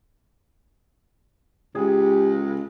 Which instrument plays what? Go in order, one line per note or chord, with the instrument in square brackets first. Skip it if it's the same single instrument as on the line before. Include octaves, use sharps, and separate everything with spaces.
[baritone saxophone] C#2 [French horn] G4 [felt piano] G#4